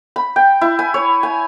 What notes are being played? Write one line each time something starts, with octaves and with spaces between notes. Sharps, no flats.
B5
G5
E4
G#5
C#5
G#5